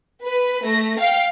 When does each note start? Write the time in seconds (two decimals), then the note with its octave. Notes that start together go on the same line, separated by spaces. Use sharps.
0.21 B4
0.64 A3 A#6
0.99 F5 G5